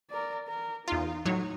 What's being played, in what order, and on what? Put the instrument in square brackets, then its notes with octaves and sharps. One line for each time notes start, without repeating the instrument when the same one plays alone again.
[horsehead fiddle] A#4 D5
A#4
[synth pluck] E2 F4 [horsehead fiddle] D#4
[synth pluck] A2 F#3 C#5 [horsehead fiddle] D#4